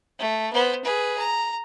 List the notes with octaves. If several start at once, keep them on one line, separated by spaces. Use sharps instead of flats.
A3
B3 C5
G#4 B4
A#5